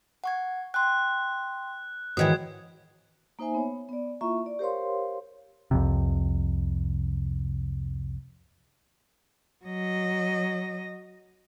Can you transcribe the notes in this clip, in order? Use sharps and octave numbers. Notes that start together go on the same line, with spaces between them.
F#5 C#6 G#6
G5 C6 F#6
G#2 D#3 E3 F#4 C#5 D#6 G#6
A#3 D#4 C5 E5 G#5
B3 C#5
B3 D5
A#3 E4 F4 E5 A#5 C#6
D5
G4 A#4 C5 C#5 F5 C6
C2 F2 C3
F#3 D#5